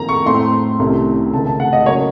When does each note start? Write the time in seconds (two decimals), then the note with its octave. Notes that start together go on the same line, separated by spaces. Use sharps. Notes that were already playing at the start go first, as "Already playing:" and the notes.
Already playing: F2 D#3 A#3 A#5
0.09 C#6
0.26 A2 A3 C4 C6
0.79 C2 C3 D#3 A3 C#4
1.33 C#2 C3 D#3 A3 A5
1.47 A5
1.60 F#5
1.73 D#5
1.86 C#3 F#3 A#3 C#5